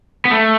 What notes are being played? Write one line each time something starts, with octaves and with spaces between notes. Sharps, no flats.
B3
A3